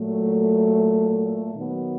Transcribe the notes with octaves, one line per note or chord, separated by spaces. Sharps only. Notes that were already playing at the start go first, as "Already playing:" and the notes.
Already playing: A#2 F#3 A3
D#3 F#3 B3